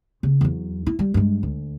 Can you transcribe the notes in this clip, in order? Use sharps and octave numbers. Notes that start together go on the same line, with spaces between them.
C#3
E2 F#3
E4
G3
G2 G#3
D2